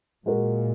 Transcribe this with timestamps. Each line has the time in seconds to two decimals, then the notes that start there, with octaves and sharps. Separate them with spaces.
0.26 A#2 G#3 F#4 A#4